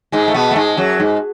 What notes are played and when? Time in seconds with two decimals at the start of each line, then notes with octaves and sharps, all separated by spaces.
0.12 G#2 G#3
0.28 A3
0.34 B2 B3
0.51 A3
0.56 G#2 G#3
0.77 F#2 F#3
1.00 G#2